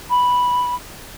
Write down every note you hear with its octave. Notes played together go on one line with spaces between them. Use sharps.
B5